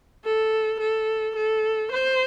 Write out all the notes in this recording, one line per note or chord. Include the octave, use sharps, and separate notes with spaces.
A4
A4
A4
C5